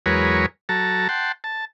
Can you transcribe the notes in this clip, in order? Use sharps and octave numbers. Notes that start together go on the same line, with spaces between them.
E2 F#3 G#3 A#4 B4 C#5
F#3 A4 A5 A#5
F#5 G5 A5 C6
A5